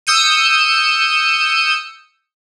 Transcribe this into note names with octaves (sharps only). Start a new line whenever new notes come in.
D#6 E6 G6 C#7 D#7